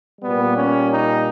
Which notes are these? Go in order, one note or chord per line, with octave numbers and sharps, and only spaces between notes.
A#2 G3 B3
C#4
D#4